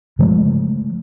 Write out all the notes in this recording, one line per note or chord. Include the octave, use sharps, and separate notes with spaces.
C#3 F3 G#3 A3